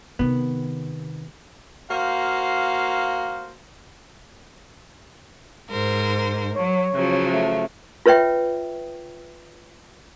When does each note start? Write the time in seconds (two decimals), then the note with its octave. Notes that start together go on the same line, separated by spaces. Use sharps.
0.19 C3 D#3 B3
1.90 A#3 F#4 C5 F5
5.69 G#2 A#4 C5
6.56 F#3 C#5
6.94 C#3 F3 F#3
7.31 A3
8.06 F4 B4 C#5 E5 G5